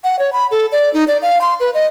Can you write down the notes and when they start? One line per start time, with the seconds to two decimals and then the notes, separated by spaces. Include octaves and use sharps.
0.04 F#5
0.19 C#5
0.33 B5
0.51 A4
0.72 D5
0.94 D#4
1.08 D5
1.22 F5
1.41 C6
1.60 B4
1.74 D#5